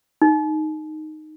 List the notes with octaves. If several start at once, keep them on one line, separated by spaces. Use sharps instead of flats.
D#4